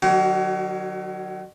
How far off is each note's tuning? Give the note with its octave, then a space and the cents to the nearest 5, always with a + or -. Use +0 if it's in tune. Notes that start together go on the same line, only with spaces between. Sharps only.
D#3 -45 F#3 +0 F#4 +40